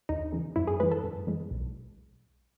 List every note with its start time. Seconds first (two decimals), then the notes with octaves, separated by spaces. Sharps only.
0.09 D#2 D#4
0.32 C#3 E3
0.56 F#2 E4
0.67 G#4
0.80 E3 G#3 B4
0.91 A4
1.04 F#2
1.27 E3 G#3
1.51 B1